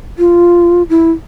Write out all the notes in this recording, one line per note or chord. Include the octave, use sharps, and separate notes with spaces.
F4
E4